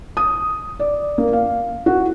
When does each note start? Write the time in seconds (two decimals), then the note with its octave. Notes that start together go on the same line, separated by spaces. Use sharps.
0.17 D#6
0.80 D5
1.18 A#3
1.33 F5
1.86 F#4